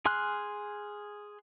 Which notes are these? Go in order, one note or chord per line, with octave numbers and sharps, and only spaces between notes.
G#4 G#5 C6 F6 F#6